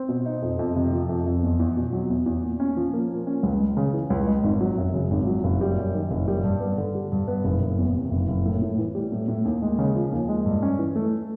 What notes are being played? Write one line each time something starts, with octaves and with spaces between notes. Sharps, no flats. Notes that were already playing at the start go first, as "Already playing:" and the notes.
Already playing: C4
B2
D#4
F2
F2
C3
F3
F2
F2
E2
E2
B2
F#3
E2
E2
A#2
C#4
F3
A#3
A#2
C#4
C#2
G#3
C#3
E3
C#2
G#3
G#1
F#3
F#2
C#3
G#1
F#3
F#1
G3
F#2
D#3
F#1
G3
G2
B3
D3
G3
G2
B3
F#1
F#1
E2
C3
F#1
F#1
A2
A2
E3
G3
A2
A2
D#2
G#3
C#3
F3
D#2
G#3
G2
C#4
E3
A3